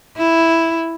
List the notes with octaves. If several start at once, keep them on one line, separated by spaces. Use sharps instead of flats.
E4